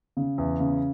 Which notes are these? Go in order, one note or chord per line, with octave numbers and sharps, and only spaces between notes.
C#3
E2
C#3